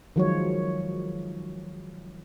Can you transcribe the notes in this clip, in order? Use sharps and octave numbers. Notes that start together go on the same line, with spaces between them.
D#3 F3 F#3 G#3 F4 C#5